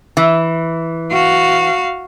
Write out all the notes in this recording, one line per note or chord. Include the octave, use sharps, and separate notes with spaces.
E3
F#4 F5